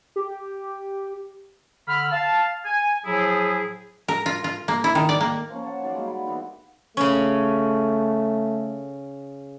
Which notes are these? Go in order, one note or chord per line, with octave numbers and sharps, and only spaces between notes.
G4
D3 B5 F6
F5 A5
G#5
A2 F3 F#3 E4 G#4
A#4
F4
F4
A#3
E4
D#3
D5
A#3
F3 A#3 C#4
F#5 A5
D#3 F#3 D5 F5
G3 G#3 A#3
F#5 B5
D#3 E3 G3 B3
C#3 A3 C#4